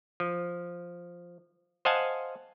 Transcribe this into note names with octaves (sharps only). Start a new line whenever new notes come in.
F3
C5 D#5 F5 F#5 G#5 A5